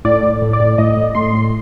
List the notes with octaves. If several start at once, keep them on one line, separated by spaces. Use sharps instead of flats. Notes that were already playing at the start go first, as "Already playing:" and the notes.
A2 D5
A2
A2
D5
A2
A2 D#5
A2
A2 C6
A2